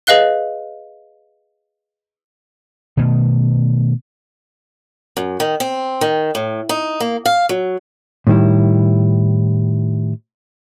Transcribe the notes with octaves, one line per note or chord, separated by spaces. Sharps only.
G#4 B4 D#5 F5 F#6 G7
B2 D#3 A3
F#2
D#3
C4
D#3
A2
D#4
A#3
F5
F#3
A2 D#3 G3 E4